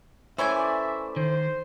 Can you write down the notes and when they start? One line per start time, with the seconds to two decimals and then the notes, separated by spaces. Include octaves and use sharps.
0.38 E3 A3 C#4 C5 D5 E5 G#5 G6
1.16 D#3 C5